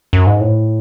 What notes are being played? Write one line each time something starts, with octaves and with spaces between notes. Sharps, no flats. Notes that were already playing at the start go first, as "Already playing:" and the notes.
F#2
G#2
A2